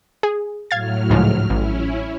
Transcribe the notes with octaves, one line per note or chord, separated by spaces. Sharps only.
G#4
A2 F#3 F5 F6 G#6 A6
C#2 G#2 F3
A1 C#4 E4